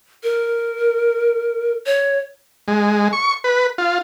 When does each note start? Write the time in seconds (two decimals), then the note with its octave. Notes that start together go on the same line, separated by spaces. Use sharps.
0.23 A#4
1.86 C#5
2.68 G#3
3.13 C#6
3.44 B4
3.78 F4